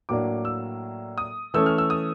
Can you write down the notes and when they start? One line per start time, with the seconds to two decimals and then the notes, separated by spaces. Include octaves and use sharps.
0.09 A2 F#3 A#3 D4 D6
0.45 E6
1.18 D#6
1.54 E3 A3 C#4 E6
1.66 F6
1.78 E6
1.90 D#6